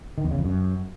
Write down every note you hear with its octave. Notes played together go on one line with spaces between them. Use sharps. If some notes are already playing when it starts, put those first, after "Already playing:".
D#3
E2
C#3
F2
F#2